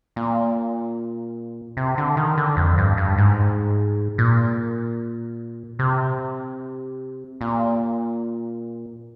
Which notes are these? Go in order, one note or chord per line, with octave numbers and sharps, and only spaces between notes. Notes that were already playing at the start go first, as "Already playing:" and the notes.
A#2
C3
D3
D#3
D3
F2
G2
G2
G#2
A#2
C3
A#2